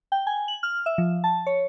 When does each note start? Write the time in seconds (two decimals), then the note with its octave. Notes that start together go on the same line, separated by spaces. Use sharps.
0.12 G5
0.27 G#5
0.48 F#7
0.63 F6
0.86 E5
0.98 F3
1.24 A5
1.47 C#5